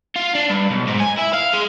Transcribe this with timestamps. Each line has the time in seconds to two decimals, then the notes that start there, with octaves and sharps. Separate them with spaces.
0.16 F4
0.35 D4
0.50 G2
0.71 B1
0.88 G#2
1.01 G#5
1.19 E4
1.34 F5
1.53 G#3